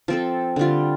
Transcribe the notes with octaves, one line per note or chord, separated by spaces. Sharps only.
F3 C4 A4
D3 G3 F4